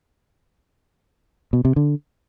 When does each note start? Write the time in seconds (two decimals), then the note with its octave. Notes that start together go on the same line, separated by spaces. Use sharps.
1.53 B2
1.65 C3
1.76 D3